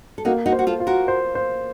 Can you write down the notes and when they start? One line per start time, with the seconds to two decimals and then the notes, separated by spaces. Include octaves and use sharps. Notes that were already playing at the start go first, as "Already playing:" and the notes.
0.18 A4
0.25 A#3 D#4 F#4
0.46 D#4 F#4
0.52 C5
0.59 F#4
0.67 F4 A4
0.80 F4
0.87 F#4 A#4
1.08 C5
1.35 C5